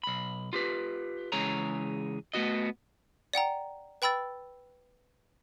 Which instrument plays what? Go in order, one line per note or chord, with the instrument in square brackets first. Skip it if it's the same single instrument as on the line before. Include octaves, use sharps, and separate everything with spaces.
[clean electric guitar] B1 B5
F4 G4 B4
C#3 E3 G#3 G#4 C#5 A#5
A3 B3 F#4 D#5
[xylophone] D5 F#5 G5 A#5
B4 G5 B5 E6 A6